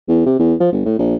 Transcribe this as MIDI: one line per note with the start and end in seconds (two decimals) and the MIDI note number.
0.08 0.24 40
0.26 0.37 48
0.39 0.54 40
0.60 0.70 53
0.72 0.85 31
0.86 0.95 45
0.99 1.15 34